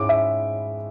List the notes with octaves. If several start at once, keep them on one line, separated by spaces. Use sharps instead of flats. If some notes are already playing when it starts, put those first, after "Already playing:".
Already playing: G#2 G#3 C#4 E4 D6
E5